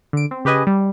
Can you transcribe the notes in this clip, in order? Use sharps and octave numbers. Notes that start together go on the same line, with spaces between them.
D3 D7
C4
C#3 G4 B4 D#5 G#5
G3